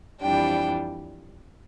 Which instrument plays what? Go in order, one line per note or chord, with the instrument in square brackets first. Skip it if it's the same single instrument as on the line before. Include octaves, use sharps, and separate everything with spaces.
[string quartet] F2 E3 G3 D4 G5